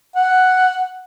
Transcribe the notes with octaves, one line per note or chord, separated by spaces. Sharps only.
F#5